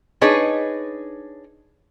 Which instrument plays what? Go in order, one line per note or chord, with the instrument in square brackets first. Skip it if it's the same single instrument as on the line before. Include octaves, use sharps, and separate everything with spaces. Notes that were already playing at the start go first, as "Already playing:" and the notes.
[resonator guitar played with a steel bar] D4 D#4 G#4 B4 C#5 D#5